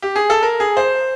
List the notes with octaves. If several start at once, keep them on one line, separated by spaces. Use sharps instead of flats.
G4
G#4
A4
A#4
G#4
C5